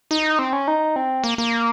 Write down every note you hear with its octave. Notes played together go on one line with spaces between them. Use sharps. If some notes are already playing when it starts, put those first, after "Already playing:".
D#4
C4
C#4
D#4
C4
A#3
A#3